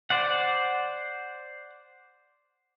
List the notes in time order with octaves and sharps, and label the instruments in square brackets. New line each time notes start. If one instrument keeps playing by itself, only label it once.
[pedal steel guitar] C5 D5 F#5